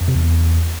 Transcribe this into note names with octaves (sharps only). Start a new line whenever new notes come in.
F2
C3
E2